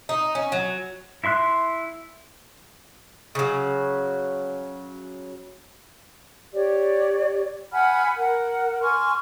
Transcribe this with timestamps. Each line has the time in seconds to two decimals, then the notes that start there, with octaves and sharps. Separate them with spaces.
0.09 D#4
0.35 C#4
0.52 F#3
1.24 E4 E5 C6 F#6
3.35 C#3 F#3
6.53 G4 C#5 D5
7.73 F#5 G#5 B5 F6
8.18 A#4 F#5
8.82 G#5 C6 C#6 F6